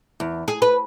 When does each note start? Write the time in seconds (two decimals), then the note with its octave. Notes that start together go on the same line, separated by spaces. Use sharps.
0.20 E2
0.48 G#4
0.62 B4